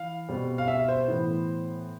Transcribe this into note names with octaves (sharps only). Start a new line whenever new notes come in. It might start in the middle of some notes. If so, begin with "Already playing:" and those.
Already playing: E3 F5
B2 G3 C4
F5
E5
C5
A2 E3 B3